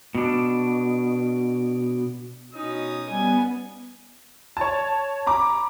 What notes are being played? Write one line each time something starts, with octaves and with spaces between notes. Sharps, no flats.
B2 D4
B2 C#4 D#4 D#6
G3 B3 G#5
C#5 A5
A#5 B5 D6